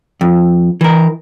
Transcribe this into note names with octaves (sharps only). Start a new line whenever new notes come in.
F2
E3 A#4